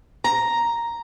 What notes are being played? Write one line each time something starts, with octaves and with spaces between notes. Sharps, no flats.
A#5